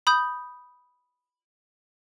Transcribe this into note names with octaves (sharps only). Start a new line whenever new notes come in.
B5 D#6 G6